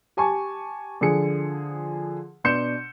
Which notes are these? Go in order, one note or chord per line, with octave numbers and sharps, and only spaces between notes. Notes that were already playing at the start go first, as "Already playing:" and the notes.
G4 G#5 A5 C#6
D3 F3 G#4 C#7
B2 D4 C6 G6 C#7 E7